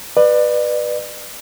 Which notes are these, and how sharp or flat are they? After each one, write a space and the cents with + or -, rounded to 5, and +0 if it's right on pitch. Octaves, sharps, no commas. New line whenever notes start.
B4 +0 D5 +35